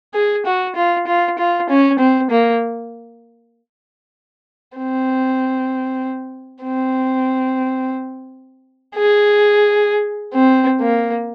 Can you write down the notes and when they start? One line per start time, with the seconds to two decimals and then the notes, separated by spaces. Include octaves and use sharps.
0.14 G#4
0.46 F#4
0.76 F4
1.07 F4
1.39 F4
1.70 C#4
1.99 C4
2.31 A#3
4.78 C4
6.63 C4
8.95 G#4
10.34 C4
10.80 A#3